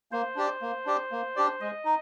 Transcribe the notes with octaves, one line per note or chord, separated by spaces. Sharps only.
A#3 C5
D4 G4 D5
A#3
D4 G4 D5
A#3
D4 G4 D5
G#3 D#5
D#4